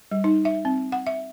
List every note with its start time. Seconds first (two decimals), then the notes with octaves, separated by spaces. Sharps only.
0.11 G3
0.24 D#4
0.45 E5
0.65 C4
0.92 F#5
1.07 E5